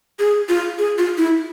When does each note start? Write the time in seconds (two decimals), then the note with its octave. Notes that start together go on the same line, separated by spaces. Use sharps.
0.19 G#4
0.49 F4
0.79 G#4
0.98 F4
1.18 E4